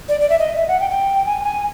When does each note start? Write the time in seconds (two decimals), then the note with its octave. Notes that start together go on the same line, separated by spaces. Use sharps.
0.08 D5
0.20 D5
0.29 E5
0.39 D#5
0.55 E5
0.68 F#5
0.80 G5
0.90 G5
1.25 G#5
1.43 G#5